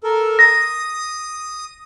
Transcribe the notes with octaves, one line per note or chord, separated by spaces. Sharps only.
A4 A#4
D#6 A#6